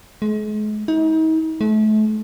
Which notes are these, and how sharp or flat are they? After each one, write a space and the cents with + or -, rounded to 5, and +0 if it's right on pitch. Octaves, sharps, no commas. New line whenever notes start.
G#3 +40
D#4 +40
A3 -35